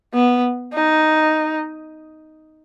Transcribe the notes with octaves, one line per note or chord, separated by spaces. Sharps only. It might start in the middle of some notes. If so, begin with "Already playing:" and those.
B3
D#4